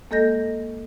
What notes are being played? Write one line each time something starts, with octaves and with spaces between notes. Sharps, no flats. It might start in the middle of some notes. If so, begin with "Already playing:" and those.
G#3 A#3 A4 D#5 G6 A#6